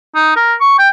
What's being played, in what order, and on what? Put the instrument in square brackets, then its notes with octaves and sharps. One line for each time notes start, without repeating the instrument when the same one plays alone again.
[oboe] D#4
A#4
C#6
G5